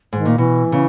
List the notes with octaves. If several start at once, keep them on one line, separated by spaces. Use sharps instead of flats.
G#2 D#3
A#2
B2 E3
C#3